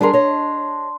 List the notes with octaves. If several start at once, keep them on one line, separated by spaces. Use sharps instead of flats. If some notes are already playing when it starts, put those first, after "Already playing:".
G3 D4 G#4 A#4 A#5 C6
C#5 D#5